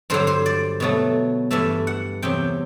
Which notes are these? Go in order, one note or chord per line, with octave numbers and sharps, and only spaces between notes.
G2 D3 F#3 C5
C5
D5
B2 F#3 A3
G2 E3 A3 E5
F#5
E2 C3 F#3 G5